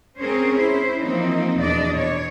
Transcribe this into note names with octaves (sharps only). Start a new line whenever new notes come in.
C4 C#4 G#4 A#4 C5 C#5
C#4 E4 C5
E3 F3 A#3 C4 D#4
E2 B2 D4 D5 D#5
B2 C#5